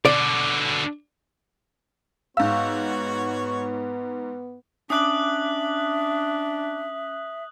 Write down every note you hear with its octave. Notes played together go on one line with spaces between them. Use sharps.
B2 D3 D5
G#2 B3 F#4 C#5 F5 E6
C#4 D4 E5 D6 D#6 F#6 F#7